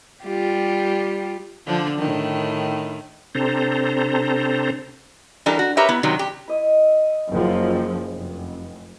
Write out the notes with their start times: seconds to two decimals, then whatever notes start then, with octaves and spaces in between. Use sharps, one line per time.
0.24 G3 F4 G4
1.66 D3 F3 D4
1.98 A2 D#3
3.35 C3 C4 D4 A4 C5 A#5
5.46 E3 G3 D4 A4 A#4
5.59 F#4
5.77 G4 A#4 B4 C#5 E5
5.89 B3 E4
6.03 C3 D#3 F#3 G3
6.19 G4
6.48 E4 D#5
7.31 F#1 F3
8.14 F1